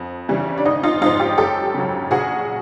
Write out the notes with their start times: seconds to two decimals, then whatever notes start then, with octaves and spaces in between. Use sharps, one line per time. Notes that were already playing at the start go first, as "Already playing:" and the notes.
Already playing: F2
0.29 C#3 E3 G3
0.58 D4
0.65 G#1 D#4
0.83 D#4 F4
1.01 G#2 F3 G#3 D#4 F4
1.20 F4 G4
1.38 F#2 G4 A4
1.74 C#3 F#3
2.11 A#1 F#4 G#4